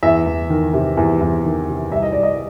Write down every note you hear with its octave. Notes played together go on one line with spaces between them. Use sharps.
E2 E5
E2
D#3
C3
E2
E2
D#3
C3
C2 E5
D#5
C2 D5
D#5